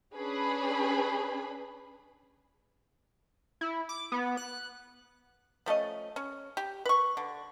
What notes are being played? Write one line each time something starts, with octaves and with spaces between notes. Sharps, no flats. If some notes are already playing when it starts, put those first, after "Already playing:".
C#4 D4 G#4 B4 B5
E4
D6
B3
F#6
F3 A3 C#4 D#5
C#4
G4
B4 C#6
D3